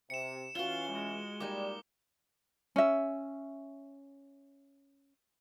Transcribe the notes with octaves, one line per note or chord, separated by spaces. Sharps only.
C3 C#7 E7
E3 C#4 F4 F#4 F5 G7
G#3
G3 A#3 D#4 G#5 D6
C#4 E5